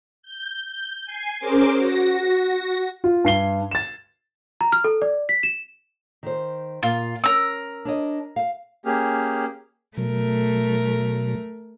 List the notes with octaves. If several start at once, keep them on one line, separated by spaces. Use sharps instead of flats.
G6
G#5 C7
C#4 G#4 A#4 C5 D6
F#4 A#6
F4
G2 C7 G7
A6 E7
A#5
F6
A4
D5
B6
E7
D#3 C5
A#2 F4
C#4 A#4 E6
D4 C#5 D#5
F5
A#3 C#4 G4 G#4 F6
B2 F#3 A3 A#4